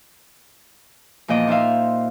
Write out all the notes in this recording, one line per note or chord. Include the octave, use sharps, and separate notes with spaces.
E2 A#2 F3 D#5 D6
D#4 F4 C5 E5 F5